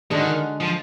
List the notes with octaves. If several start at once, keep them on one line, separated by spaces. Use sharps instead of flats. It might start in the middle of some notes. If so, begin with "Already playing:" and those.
D3 D#3 G#3 D4 F#4
F3